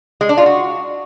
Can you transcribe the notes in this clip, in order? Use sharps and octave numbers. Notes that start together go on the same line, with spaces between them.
G#3
D4
F4
F#4